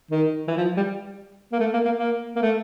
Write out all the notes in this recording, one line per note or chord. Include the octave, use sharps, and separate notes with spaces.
D#3
E3
F3
G3
A#3
A3
A#3
A#3
A#3
A#3
A3